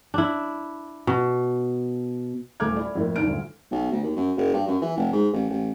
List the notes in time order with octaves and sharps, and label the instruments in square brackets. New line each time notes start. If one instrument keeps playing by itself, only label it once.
[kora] D4 E4
B2
[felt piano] D#1 A3 D6 F6 G#6
E4 D5
F2 A2 A#3
D#2 D4 F6 D7
D#1 D2
[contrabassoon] B1
D2
D#2
F#2
F#1
G2
F#2
E3
F1
G#2
A1
A1